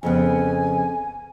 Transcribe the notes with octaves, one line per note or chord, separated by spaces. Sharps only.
F2 C#3 B3 G#5